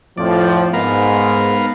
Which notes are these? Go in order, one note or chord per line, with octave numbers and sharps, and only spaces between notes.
F2 A2 F3 D5
G#2 B3 A#4 F5